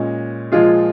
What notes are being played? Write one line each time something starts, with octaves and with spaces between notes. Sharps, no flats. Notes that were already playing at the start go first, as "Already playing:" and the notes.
Already playing: A#2 G#3 C#4
A#2 F3 G#3 F4 G#4